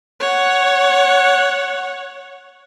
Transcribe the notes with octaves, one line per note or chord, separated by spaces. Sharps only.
C#5 F#5